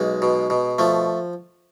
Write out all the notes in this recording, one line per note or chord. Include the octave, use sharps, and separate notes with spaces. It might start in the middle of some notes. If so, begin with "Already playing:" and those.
Already playing: B1 G#3
B2
B2
F3 A3